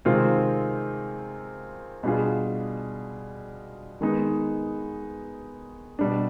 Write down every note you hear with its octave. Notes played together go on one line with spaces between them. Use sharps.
C3 D#3 G#3 C4 F4
B2 G3 D4 F4 G#4
D#3 G#3 B3 D#4
B2 G3 D4